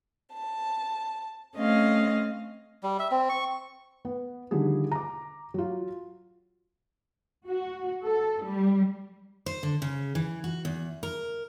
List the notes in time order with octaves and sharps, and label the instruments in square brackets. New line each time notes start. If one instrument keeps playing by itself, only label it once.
[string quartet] A5
A3 C4 C#4 D#5 F5
[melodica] G3
E5
C4
C#6
[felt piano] B3
D3 D#3 F3 G3 G#4
A#5 D6
F#3 F4
[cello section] F#4
A4
G3
[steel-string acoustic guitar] C5
D3
C#3
E3
F#4
E2
A#4